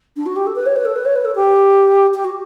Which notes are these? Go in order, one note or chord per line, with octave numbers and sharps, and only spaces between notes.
D4
F#4
G4
A4
B4
C#5
B4
A4
B4
C#5
B4
A4
G4
G4
F#4